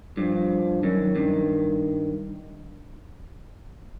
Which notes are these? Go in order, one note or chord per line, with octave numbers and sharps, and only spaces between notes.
G2 F3
F#2 D#3
G2